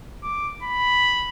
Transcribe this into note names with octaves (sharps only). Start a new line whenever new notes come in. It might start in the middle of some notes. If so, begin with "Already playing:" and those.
D6
B5